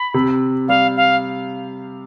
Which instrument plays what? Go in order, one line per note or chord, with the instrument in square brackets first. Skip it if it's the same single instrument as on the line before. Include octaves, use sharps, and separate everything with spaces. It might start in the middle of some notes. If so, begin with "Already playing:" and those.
Already playing: [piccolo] B5
[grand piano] C3
[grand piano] G3 [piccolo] F5
[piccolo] F5